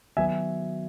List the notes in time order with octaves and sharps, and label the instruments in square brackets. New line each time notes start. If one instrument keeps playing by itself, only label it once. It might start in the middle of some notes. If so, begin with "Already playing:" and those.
[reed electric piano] D#3 F#3 B3 F#4 [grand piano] E5 G#5